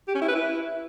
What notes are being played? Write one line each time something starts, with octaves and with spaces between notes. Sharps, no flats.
G4
C#4
E4
B4
E4